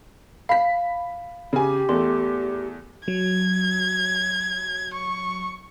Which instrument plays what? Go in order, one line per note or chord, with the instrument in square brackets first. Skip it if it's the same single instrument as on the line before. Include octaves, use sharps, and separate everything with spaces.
[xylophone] F5 [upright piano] B5 B6
[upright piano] C#3 G#5 [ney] G4
[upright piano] E2 A3 [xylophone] C6
[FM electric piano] F#3 [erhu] G#6
[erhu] C#6